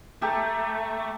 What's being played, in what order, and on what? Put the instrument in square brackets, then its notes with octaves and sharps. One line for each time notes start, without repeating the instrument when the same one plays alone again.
[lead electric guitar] A3 [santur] G4 A4 A#5